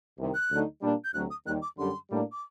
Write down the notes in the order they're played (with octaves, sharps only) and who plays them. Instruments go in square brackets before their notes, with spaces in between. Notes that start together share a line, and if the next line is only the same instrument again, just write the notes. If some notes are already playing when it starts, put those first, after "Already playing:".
[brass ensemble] C2 C3 D#3
[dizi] F#6
[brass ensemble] D2 D3 F#3 A3 D#4
A#2 G3 A#3 D4
[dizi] G6
[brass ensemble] D2 C3 F#3 [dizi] F#6
[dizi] D#6
[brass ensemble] D#2 D#3 G3 [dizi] F#6
[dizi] D6
[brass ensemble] F#2 D3 G3 [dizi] C6
[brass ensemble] A2 G3 A#3 D4
[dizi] D6